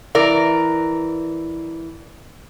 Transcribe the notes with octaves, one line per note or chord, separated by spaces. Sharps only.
E3 A#4 D5